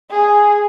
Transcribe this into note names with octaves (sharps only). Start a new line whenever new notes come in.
G#4